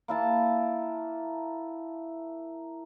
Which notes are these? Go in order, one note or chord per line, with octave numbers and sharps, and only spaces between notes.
A#3 E4 A5